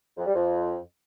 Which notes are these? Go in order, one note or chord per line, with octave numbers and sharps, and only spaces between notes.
F2
G3
F2